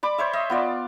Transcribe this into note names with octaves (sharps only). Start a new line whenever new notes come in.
D5 B5 D6
C5 C#5 E5
D#5 E5
B3 F4 D5